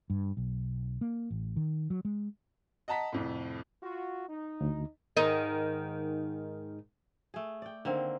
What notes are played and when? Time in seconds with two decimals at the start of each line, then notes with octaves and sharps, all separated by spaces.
0.10 G2
0.37 B1
1.01 A#3
1.30 A1
1.56 D#3
1.90 F#3
2.05 G#3
2.88 D#5 F#5 A5 A#5 B6
3.13 C2 F2 A2
3.82 F4 F#4
4.28 D#4
4.61 D2
5.17 G#2 D#3 D#4
7.34 A3 G#4
7.62 D5 G5
7.85 D3 D#3 A#3 C4